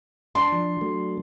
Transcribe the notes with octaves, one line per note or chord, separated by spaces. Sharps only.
D4 C6
F3
F#3 A3